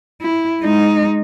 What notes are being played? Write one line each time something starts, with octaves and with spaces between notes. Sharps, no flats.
E4
G#3 D#4